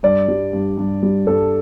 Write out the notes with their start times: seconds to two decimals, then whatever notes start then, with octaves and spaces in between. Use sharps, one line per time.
0.03 G2 D5
0.28 G3
0.53 G2
0.78 G2
1.03 G3
1.27 G2 A4